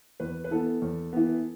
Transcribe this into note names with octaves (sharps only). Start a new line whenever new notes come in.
E2 B4
B4
E3 B3 A4
E2
E3 B3